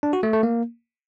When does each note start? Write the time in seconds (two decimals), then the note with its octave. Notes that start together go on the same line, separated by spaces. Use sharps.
0.03 D4
0.13 F#4
0.23 A3
0.33 A3
0.43 A#3